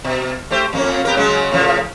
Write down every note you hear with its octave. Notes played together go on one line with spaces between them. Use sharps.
B2
A3 G4 C5
F2 A#3 C#4
B3 G4 A#4
C#3 F#3 G#3
A2 C#3 F3